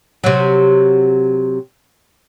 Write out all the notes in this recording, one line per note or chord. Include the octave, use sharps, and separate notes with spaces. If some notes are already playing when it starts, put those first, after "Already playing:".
C3 F#3